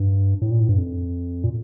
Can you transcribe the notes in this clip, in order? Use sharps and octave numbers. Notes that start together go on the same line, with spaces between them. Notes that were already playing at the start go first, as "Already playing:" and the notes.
Already playing: G2
A2
A#2
A2
G2
F2
A#2